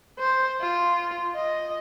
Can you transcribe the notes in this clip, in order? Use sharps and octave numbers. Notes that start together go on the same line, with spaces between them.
C5
F4
D#5